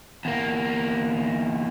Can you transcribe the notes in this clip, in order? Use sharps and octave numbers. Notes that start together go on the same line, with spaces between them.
E2 A#3